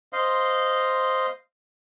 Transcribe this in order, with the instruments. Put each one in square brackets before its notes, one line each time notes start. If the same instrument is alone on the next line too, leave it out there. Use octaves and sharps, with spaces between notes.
[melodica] C5 D#5 F5 C6